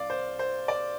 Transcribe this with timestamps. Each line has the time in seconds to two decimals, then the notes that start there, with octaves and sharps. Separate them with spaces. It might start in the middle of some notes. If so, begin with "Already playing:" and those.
Already playing: C2 D5 F5
0.10 C5
0.39 C5
0.68 D5